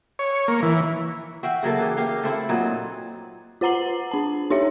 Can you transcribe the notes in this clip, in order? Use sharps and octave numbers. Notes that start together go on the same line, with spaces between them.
C#5
A#3
E3
F#4 E5 F5 G5
C#3 F#3 A#3 A4
E3 G4
A#3 G4 A#4 F5
A3 C4 E4
A#2 F#3 D#4
F4 C5 F#5 A#5 C7 F#7
D4 A5
D#4 G4 C#5 E5